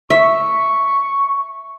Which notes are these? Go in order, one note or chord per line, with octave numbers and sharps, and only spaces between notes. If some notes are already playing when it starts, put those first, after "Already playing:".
E5 C#6